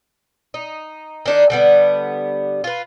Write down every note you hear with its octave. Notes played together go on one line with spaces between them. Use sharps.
D#4
D#3 D4 D#4
D3 G3 B3
F4 B4